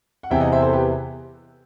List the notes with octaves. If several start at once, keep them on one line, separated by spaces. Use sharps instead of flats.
F#5
E2 C3 E3 E5 G5
D#5 F#5
C5 E5
A4 C5
G4 B4